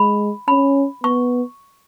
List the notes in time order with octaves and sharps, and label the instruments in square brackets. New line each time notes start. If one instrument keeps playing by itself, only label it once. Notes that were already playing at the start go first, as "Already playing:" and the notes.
Already playing: [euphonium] G#3 [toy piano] B5
[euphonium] C#4 [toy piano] B5
[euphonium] B3 [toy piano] C#6